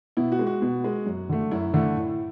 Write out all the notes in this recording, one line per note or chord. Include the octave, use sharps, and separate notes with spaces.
B2 E4
F#4
G#3
F#4
B2
G#3
F#2
D3 A3
F#2 E4
D3 A3
A2